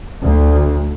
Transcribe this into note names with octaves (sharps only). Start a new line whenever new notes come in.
D2